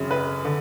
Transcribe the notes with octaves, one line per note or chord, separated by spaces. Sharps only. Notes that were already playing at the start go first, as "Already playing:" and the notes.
Already playing: G#1 F#2 C#3
B4
D3